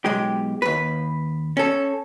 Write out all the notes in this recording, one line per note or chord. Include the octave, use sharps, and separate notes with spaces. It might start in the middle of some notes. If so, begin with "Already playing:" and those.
B1 G#3 G4
D#2 B4
C#4 A4